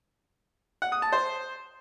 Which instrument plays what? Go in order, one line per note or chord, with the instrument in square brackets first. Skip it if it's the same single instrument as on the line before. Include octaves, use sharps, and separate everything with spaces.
[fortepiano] F#5
D#6
A5
C5